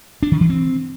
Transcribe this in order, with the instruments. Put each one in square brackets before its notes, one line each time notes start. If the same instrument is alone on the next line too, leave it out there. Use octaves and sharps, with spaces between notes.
[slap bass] D4
D#3
E3
C4